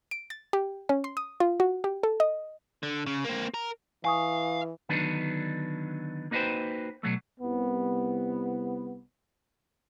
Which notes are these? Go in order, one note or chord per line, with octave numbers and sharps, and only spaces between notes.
D7
A6
G4
C#4
C6
D#6
F4
F#4
G4
A4
D#5
D3
C#3
A#3 C4
A#4
E3 F5 G#5 C#6 D#6
D3 D#3 F#3 B3 D4 D#4
A#3 D#4 F#4 B4 C5 G5
B2 F#3 A3
C2 B3